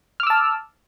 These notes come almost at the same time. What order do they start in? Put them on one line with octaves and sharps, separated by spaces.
F6 D6 E6 A5